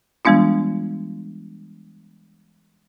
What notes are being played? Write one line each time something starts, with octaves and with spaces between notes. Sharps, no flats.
E3 G3 G#3 B3 D4 F4